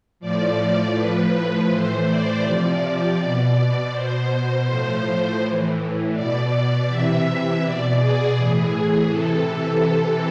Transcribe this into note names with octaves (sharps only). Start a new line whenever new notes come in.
A2 F3 D5
A2 F3 B4
A2 E3 C5
D5
C3 F3
B2
B2 C5
A2 F3 C5
A2 E3
B2 D5
C3 E3 E5
B2 D5
G#4
A2 E3
C3 E3 A4
C3 E3 A4